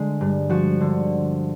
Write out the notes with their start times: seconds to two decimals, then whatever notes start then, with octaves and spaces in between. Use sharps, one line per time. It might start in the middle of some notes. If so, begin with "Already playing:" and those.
Already playing: D3 G#3
0.21 G2
0.49 F3 F#4
0.81 D3